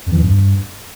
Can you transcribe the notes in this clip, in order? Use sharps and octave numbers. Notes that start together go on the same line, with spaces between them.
F2
E3
E2
G2